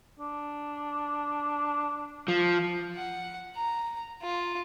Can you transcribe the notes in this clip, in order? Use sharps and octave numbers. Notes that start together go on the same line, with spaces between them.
D4
F3
F#5
A#5
F4